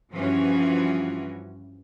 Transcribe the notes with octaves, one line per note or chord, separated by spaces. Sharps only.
G2 E3 F3 C#4 F#4